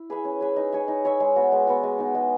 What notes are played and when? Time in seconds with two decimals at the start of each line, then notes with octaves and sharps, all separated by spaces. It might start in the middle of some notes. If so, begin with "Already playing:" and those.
Already playing: E4
0.10 G#4 B4 E5
0.25 C#4
0.41 G#4 B4 E5
0.56 D#4
0.72 G#4 C#5 E5
0.88 D#4
1.04 G#4 C#5 E5
1.20 G#3
1.36 B3 F#4
1.52 G#3
1.67 B3 F#4
1.83 G#3
1.99 B3 D#4
2.15 G#3